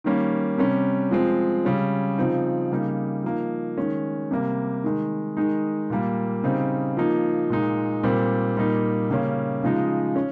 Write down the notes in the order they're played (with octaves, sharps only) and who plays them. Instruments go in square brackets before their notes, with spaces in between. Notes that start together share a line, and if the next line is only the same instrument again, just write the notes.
[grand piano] D#3 G3 A#3 C#4
C3 G3 C#4
F3 G#3 C4
C#3 G3 C#4
C#3 F3 C4 D#4
C#3 G3 A#3 D#4
F3 A#3 D#4
D#3 G#3 C#4
C3 G3 A#3
D#3 G#3 D#4
D#3 G#3 D#4
A#2 G3 A#3
C#3 G3 C4 D#4
F3 A#3 D#4
A#2 G#3 D#4
A#2 G3 C4
A#2 G3 A#3 D#4
C#3 G3 A#3 C#4
C#3 F3 G#3 D#4
C#4